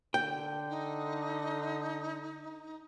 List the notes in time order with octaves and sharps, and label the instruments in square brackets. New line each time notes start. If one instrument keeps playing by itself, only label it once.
[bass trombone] D3 [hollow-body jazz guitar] G5
[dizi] D#4